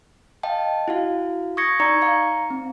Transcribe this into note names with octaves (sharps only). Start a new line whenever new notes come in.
D#5 F5 G5 A5
E4 F#4 F5
C#6 D#6 G#6 A#6 C#7
D#4 D5 A#5 C#6 G#6 C#7
F5 A#5 C#7
C4